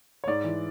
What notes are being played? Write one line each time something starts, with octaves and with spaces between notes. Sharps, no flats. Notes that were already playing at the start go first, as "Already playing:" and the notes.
C#5
G#2 D5
E3